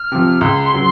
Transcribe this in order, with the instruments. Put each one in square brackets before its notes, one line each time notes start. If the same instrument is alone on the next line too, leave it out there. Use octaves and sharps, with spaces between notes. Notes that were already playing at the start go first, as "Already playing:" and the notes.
Already playing: [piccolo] F6
[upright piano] C3 F3
[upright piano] C#2 [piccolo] C6
[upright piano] C#3 F#3